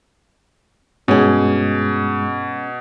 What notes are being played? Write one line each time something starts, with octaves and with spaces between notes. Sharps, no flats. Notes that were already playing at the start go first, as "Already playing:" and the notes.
G2 B2 G#3 C#4 G#4